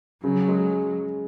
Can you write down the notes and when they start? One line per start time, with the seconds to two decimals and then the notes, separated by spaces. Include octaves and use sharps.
0.24 C#3 F#3
0.48 G#3